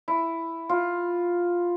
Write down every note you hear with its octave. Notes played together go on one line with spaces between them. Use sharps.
E4
F4